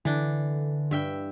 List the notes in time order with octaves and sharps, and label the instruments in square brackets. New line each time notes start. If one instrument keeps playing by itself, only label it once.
[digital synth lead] D3 [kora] E3 D4
[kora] G2 E5 G5